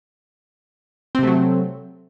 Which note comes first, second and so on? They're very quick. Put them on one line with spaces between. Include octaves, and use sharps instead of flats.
C4 C3 A3 F#3